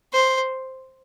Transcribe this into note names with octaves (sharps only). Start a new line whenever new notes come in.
C5